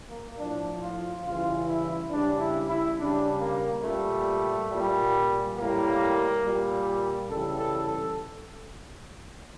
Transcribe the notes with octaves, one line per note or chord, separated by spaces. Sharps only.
A#3
A2 F3 D4
F4
C#3 E3 G3 F4
E4
C#3 G3 D4
E4
E4
C#3 G3 D4
A#3
A#2 G3 A3
A#2 G3
A2 G3 A#3
A#2 G3
C#3 E3 G3 A4
A4
A4